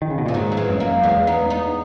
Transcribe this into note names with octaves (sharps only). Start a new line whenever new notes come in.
D#3
C#3
B2
A#2 E3
G#2 D#3 F#3
F#3
E3 G#3
F#2
F#3 A#3
E2 G#3 B3
B3 D#4
B3 D#4